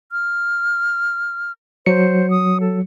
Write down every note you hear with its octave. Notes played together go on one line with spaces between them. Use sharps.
F6
F#3 C5 C#7
D#6
A4